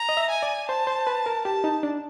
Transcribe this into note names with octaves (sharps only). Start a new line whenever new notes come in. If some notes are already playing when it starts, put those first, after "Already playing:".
Already playing: A#5
D#5
E5
G#5
D5
C5 A5
C5
B4
A#4
G4 A5
D#4
D4